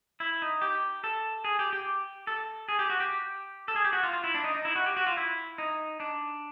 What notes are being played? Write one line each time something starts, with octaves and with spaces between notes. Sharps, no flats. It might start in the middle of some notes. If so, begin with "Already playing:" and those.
E4
D#4
G4
A4
G#4
G4
G4
A4
G#4
G4
F#4
G4
A4
G#4
G4
F#4
F4
F4
E4
D4
D#4
D#4
E4
F#4
G4
F#4
F4
E4
D#4
D4